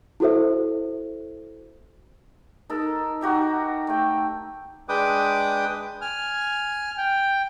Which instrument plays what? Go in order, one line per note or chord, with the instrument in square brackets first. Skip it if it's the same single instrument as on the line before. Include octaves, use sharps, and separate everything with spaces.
[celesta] E4 F#4 A4 C5 E5
[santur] D#4 A4 A#4
D#4 F#4 G4 E5
A3 G5
[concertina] G#3 D4 B4 G5 D6 D#6
G#5 F6
G5